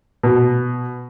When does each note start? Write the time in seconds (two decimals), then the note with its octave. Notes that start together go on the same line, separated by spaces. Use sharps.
0.23 B2